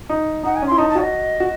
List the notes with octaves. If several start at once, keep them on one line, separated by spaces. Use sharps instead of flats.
D#4
D#4 F#5
G#5
C#4 C6
E4
D#4 A5
A5
F#4 C#5
D#5
F#4